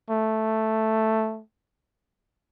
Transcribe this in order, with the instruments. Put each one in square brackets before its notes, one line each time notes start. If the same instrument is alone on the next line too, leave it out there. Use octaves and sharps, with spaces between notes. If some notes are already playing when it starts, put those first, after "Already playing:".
[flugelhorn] A3